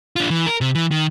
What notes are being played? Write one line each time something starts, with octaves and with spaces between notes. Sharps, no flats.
D4 F4
E3
A#4
C3
E3
D#3